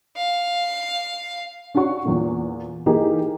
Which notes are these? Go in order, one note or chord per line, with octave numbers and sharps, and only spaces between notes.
F5
C#4 D4 F#4 F#5 C#6
E2 A#2
E3 A#3 D#4 G4 G#4